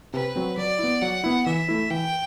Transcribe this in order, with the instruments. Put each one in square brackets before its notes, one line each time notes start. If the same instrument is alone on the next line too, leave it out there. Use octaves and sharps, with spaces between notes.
[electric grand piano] C3 [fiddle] B4
[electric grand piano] F#3 C4
[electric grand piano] F#3 [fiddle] D5
[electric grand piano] B3 E4
[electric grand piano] F#3 [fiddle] F#5
[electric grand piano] B3 E4
[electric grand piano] E3 [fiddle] E5
[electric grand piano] A3 E4
[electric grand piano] E3 [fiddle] G5